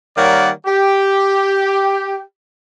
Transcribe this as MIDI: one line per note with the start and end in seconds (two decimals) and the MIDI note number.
0.17 0.50 51
0.17 0.50 55
0.17 0.50 58
0.17 0.50 73
0.17 0.50 74
0.17 0.50 78
0.66 2.21 67